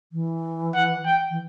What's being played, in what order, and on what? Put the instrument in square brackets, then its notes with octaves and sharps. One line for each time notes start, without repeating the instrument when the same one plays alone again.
[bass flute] E3
[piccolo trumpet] F#5
G5
[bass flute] E3